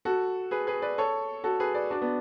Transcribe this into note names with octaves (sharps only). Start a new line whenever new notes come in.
F#4 A4
G#4 B4
G#4 B4
B4 D5
A4 C#5
F#4 A4
G#4 B4
B4 D5
D4 F#4
B3 D4